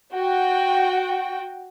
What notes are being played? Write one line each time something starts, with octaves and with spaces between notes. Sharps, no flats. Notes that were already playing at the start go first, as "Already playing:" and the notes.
F#4 G5